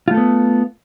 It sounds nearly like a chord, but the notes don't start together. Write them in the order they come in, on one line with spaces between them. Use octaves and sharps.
F4 A3 A4 B3